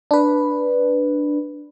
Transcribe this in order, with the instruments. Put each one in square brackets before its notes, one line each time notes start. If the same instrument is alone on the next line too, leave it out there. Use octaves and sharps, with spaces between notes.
[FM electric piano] D4 B4